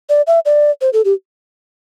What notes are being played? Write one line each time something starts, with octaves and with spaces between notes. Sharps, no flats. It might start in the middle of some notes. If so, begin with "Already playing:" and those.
D5
E5
D5
C5
A4
G4